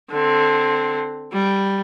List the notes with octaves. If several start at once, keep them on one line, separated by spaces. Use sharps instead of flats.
D3 C4
G3